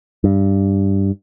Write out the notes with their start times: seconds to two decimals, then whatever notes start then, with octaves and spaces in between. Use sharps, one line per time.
0.24 G2